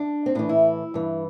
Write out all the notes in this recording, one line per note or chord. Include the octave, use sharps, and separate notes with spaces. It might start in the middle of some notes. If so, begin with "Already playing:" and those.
Already playing: D4
C4
A2 E3 D4
E4
G2 E3